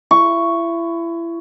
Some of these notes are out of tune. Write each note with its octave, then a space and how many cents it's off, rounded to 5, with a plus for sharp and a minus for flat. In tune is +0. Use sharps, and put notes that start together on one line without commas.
E4 +30 C#6 +0